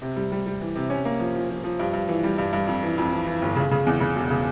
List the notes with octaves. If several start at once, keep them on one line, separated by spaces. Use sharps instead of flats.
C3
G3
G3
G3
E3
C3
C#4
A#3
F3
F3
F3
F3
G2
G2
E3
G3
G2
G2
F2
E3
F2
E3
E3
G1
C#3
C#3
E2
C#3
E1
C#3